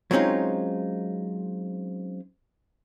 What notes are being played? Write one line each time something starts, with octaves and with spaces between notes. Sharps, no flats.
F#3 G#3 C4 C#4 D#4 F4